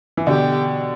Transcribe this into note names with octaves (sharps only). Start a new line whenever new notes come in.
E3
B2 D3 G4